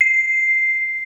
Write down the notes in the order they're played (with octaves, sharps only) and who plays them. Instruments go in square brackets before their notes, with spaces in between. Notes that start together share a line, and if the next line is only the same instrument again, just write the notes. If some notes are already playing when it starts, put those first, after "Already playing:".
[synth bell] C7